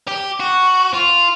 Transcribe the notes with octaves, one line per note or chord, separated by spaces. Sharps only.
G4
F#4
F4